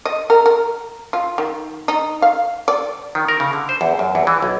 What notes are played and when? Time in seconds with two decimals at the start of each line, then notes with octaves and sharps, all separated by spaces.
0.05 D#5
0.30 A#4
0.46 A#4
1.13 F4
1.38 D#3
1.88 D#4
2.22 F5
2.68 D5
3.15 D#3
3.28 A#4
3.40 C#3
3.53 D3
3.69 C5
3.81 E2
3.99 F#2
4.15 E2
4.27 E3
4.42 B1